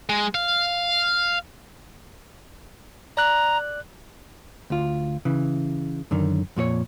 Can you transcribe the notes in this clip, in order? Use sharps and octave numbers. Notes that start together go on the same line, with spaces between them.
G#3
F5
D5 A#5 F#6
D2 F4
C#3 E3
F#2 D3 D#3
F2 A#2 F#4 C#5